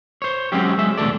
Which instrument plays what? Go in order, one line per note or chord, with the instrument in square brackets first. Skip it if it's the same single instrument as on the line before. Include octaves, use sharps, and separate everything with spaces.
[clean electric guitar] C5 C#5
F#3 G#3 C4 C#4 G4
G#3 E5
B1 E2 D3 A3 A4 D5